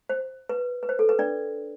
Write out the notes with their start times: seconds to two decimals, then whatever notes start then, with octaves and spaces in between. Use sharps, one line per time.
0.09 C5
0.49 B4
0.83 B4
0.89 C5
0.99 A4
1.09 B4
1.19 D4 D5